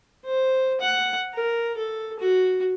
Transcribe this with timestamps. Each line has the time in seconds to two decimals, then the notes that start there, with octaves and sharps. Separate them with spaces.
0.25 C5
0.81 F#5
1.34 A#4
1.77 A4
2.19 F#4